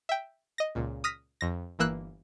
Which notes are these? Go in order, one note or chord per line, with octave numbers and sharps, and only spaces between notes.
E5 G5
D#5 A#6
C#2 A#2
D#6 F6 A#6 B6
F2 A#6
G1 E3 A#3 E6 F#6